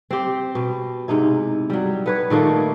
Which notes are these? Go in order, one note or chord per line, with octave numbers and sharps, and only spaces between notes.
C4 G4
B2
G#2 C3 D#4 E4
F#3 G3
B3 B4 C#5
A#2 D#3 A3 A#3